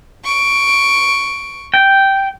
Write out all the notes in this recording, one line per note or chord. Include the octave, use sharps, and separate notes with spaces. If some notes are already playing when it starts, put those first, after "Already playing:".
C#6 D7
G5